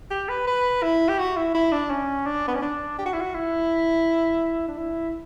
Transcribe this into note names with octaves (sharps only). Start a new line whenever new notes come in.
G4
B4
B4
E4
G4
F#4
E4
E4
D4
C#4
D4
B3
C#4
D4
G4
F#4
E4
F#4
E4
D4
E4